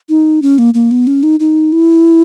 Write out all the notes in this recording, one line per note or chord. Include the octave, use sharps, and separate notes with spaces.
D#4
C#4
A#3
A#3
B3
C#4
D#4
D#4
E4